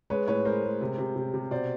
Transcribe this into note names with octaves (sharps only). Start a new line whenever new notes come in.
G#3 B4 C#5
A2 B4 C#5
G#3 A#4 C5
G#3
C3
C3
C3
C3
B2 C5 D5